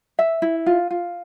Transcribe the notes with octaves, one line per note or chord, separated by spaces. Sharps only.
E5
E4
F4
F4